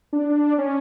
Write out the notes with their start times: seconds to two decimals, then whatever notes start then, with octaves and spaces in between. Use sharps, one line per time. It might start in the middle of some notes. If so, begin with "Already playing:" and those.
0.13 D4
0.58 C#4